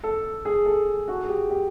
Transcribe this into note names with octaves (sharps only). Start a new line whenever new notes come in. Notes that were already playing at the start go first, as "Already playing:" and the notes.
A4
G#4
A4
F#4
G#4
G4
G4